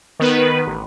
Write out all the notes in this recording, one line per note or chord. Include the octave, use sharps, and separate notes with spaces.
D#3 B3 B4
A1